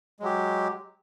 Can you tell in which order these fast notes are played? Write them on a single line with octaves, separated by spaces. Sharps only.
G#3 F#3 G4